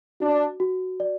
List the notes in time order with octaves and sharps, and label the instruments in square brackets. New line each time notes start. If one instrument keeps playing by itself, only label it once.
[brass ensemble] D4 [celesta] F#4
[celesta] F#4
D5